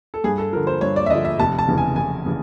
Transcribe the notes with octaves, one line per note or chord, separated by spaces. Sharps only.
A4
G2 G#4
A4
D3 F3 A#4
C5
G2 C#5
D5
E5
D3 F3 D#5
E5
F1 A5
A5
E2 C#3 E3
G#5
F1 G#5
C#3 E3